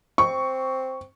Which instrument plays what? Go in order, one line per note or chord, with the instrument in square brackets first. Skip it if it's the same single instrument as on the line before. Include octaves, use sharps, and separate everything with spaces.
[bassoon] C4 [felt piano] C#6